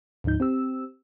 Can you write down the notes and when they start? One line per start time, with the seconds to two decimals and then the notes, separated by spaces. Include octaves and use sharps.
0.24 D2 G#2 F3 D#4 G6
0.40 C4 G4 E6